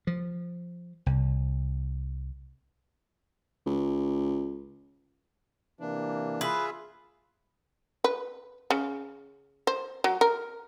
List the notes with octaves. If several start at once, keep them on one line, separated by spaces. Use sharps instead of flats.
F3
C2
C#2
C3 E3 A#3 D4
F4 G#4 B4 E5
B4
C#3
C5
F#3
A#4